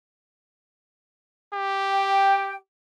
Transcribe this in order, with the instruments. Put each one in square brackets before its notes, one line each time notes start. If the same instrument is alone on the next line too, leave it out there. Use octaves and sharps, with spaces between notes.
[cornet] G4
[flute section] G5